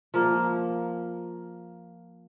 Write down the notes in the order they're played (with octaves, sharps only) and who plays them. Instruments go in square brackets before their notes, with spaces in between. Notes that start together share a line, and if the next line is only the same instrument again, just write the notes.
[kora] F3 A#3